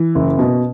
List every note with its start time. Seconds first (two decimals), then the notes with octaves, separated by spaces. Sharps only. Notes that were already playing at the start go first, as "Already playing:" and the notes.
Already playing: E3
0.15 F#1
0.39 B2